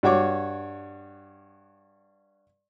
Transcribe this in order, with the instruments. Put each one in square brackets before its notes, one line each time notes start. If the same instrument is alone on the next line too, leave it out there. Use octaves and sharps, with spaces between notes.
[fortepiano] G2 F#4 C#5 D6